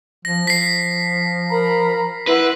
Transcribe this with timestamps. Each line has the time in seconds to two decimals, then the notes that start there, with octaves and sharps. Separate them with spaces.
0.25 F3 A#6
0.47 F3 B6 C7
1.50 A#4 A#5 B5
2.27 E4 B4 F#5 C6